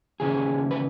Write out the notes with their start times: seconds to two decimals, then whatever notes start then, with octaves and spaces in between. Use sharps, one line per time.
0.20 D#2 C#3 E3 G#4
0.71 B4